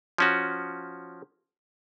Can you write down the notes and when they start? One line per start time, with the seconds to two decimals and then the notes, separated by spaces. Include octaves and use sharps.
0.18 F3 C#4 F#4